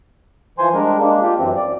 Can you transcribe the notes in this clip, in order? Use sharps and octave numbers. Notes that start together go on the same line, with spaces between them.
E3 F3 C5 G#5 C6
G3 G#3 D4 A#4
G#3 A#3 D4
F4 G4
F#2 E3 C4
D5